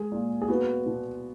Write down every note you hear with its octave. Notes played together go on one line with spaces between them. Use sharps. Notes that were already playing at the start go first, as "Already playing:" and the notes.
Already playing: G#3 G#4
A#2
G#4
B3 F#4
B2